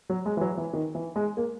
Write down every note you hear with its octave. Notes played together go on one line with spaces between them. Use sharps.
F#3
G#3
E3
F#3
E3
D#3
E3
G#3
A#3